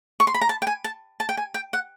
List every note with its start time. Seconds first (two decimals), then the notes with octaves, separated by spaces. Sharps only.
0.20 C#6
0.27 C6
0.34 B5
0.41 A#5
0.49 A5
0.62 G5
0.67 G#5
0.84 A5
1.20 A5
1.29 G5
1.37 G#5
1.54 G5
1.73 F#5